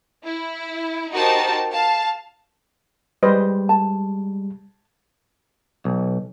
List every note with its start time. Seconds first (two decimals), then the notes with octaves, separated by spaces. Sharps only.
0.25 E4
1.12 D#4 F#4 G4 A#4 C5 A5
1.72 F5 A5
3.23 G3 G#3 B4 C5 D#5
3.69 A5
5.85 B1